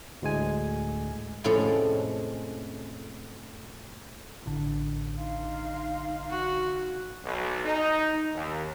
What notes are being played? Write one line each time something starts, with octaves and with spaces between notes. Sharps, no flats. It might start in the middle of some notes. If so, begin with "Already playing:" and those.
D2 A2 G#3 G#5
F2 A2 C3 F3 G#3 C#4
A1 D3
D#4 F5 C6
F#4
B1
D#4
D#2